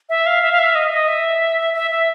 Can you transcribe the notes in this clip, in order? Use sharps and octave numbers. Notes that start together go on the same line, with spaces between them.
E5
F5
E5
F5
E5
D#5
D#5
E5
E5
E5